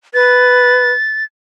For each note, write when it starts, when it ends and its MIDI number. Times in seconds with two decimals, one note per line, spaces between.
0.14 0.91 71
0.14 1.24 93